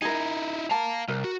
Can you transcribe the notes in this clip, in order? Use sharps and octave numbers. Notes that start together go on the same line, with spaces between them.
D#4 E4 G#4 A#4
F5 A5 A#5
C2 A#4
F#4